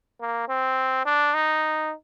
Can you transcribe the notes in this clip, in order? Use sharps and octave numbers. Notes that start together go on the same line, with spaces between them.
A#3
C4
D4
D#4